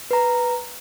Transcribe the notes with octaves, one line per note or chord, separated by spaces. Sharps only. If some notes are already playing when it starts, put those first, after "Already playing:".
B4 A#5